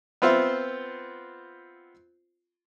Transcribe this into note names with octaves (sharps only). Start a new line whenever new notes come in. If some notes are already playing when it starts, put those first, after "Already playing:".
B3 C4 F4 C5 E5